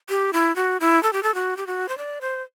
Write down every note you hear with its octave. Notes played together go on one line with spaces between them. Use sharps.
G4
E4
F#4
E4
A4
G4
A4
F#4
G4
F#4
C5
D5
C5